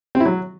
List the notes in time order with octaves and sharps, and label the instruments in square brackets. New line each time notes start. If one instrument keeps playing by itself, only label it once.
[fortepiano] C4
E4
F#3